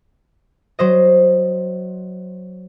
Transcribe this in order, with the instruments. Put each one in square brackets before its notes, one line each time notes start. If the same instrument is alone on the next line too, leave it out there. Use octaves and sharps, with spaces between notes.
[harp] F#3 C5 D#5